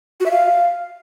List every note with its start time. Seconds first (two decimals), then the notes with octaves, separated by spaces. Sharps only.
0.20 F#4
0.25 E5
0.31 F5